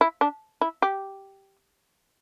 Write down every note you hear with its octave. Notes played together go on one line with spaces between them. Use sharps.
E4
D4
E4
G4